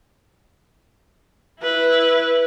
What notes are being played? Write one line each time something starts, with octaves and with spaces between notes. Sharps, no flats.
E4 B4